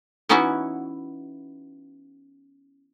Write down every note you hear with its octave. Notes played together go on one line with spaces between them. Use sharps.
E3 B3 C#4 D#4 E4 F#4